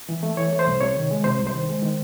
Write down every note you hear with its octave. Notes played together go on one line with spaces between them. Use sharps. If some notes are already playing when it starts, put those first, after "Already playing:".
E3
A3
E3 C#5
A3
C5
C2
C3 C#5
D#3
G#3
C3 C5
C2
C5
D#3
G#3
D#3